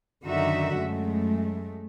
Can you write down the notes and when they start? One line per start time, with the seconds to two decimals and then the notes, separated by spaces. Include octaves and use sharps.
0.24 F#2 D3 D#3 D#4 F#4 E5
0.77 F#2 G#3 A3